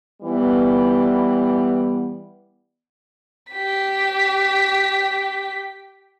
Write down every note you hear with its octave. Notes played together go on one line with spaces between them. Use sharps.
E3 G3 B3
G4 B6